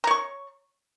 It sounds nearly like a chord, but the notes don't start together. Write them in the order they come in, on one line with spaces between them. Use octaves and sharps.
A#5 C#5 C#6